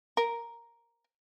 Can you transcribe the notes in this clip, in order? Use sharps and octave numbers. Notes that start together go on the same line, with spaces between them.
A#4